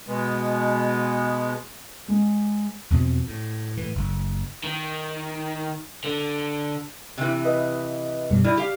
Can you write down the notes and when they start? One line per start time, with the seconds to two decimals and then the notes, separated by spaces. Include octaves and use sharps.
0.07 B2 G#3 B3
2.08 G#3
2.90 E2 B2 F3 C4
3.28 A2
3.77 A2 E3
3.95 F#1
4.64 D#3
6.04 D3
7.18 C3 E3
7.45 B4 D#5
8.30 F#2 B2 G3
8.44 G3 E4 F6
8.57 G4 F5